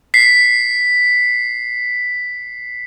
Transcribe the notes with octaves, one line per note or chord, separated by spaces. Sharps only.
B6 C7